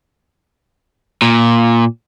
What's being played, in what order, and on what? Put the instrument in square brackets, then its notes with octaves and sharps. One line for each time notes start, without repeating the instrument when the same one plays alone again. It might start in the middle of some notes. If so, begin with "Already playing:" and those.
[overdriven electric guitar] A#2